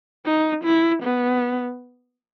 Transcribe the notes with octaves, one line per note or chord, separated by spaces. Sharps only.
D#4
E4
B3